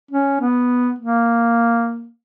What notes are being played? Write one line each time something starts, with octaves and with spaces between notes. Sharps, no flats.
C#4
B3
A#3